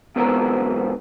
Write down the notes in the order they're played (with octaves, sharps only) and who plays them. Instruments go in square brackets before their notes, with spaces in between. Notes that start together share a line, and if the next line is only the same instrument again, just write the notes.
[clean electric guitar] E2 G#2 B2 B3 C4 A#4